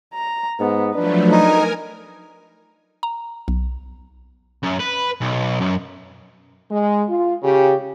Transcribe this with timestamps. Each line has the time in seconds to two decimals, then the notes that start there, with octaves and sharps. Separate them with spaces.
0.14 A#5
0.60 G#2 B3
0.95 F3 F#3 A3 D4 B4
1.32 D#4 A#4 G#5
3.03 A#5
3.48 B1
4.63 F#2
4.79 B4
5.21 B1
5.61 F#2
6.70 G#3
7.09 F4
7.43 C#3 G4